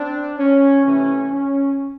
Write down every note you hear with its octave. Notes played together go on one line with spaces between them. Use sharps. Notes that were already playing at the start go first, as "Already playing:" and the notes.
Already playing: C4 D4
C#4
C3 E3 A3 C#4
C#4